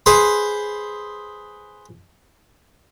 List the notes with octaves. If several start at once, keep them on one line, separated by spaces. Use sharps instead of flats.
G#4 B4 C5 C6